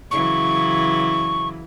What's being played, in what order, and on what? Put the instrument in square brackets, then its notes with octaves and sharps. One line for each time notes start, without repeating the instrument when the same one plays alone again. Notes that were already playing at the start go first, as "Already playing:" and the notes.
[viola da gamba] C#3 E3 F#3 [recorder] C#6